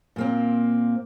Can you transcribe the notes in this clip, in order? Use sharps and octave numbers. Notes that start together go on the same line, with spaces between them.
A#2 A#3 C4